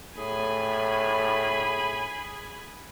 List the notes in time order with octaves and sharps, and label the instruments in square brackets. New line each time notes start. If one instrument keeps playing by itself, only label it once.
[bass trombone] A2 [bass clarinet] G#4 [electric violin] G#5 B5